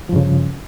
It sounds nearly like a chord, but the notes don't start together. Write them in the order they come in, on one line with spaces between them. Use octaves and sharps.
F3 G2 C#3